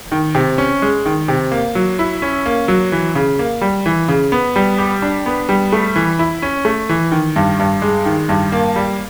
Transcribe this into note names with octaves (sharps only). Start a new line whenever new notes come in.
D#3
C3
C#4
G#3
D#3
C3
A#3
F#3
E4
C#4
A#3
F#3
E3
C#3
A#3
G3
E3
C#3
B3
G3
G4
D4
B3
G3
A3
E3
E4
C#4
A3
E3
D#3
G2
G2
G#3
D#3
G2
A#3
G3